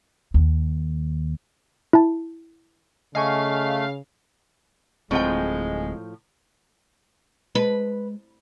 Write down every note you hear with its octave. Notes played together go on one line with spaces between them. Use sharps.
D#2
E4 A5
C#3 A3 D#5 F5 G#5 C#6
D1 A2 F3 G#3 C4 G5
G#3 B4